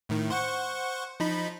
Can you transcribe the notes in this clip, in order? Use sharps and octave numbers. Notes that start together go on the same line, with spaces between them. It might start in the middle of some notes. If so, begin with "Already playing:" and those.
A2 D#3
C5 F#5 C#6
F3 D#4 B5